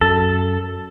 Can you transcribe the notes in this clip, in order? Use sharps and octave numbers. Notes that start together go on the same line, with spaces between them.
F#2 A4